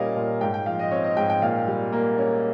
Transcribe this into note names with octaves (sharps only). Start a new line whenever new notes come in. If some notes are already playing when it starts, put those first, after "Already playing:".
Already playing: A#2 G3 C#4 A#4 D#5 F5
A#2
G#2 G5
G5
F3 F5
D#5
C4 C#5
D#5
G#2 G5
G5
A#2 F5
G3
A#3
C#4